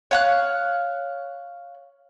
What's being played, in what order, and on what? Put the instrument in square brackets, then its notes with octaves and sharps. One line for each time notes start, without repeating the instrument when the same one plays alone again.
[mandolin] C#5 F5 F#6